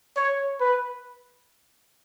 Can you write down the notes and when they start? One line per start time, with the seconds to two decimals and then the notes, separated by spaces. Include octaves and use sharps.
0.16 C#5
0.60 B4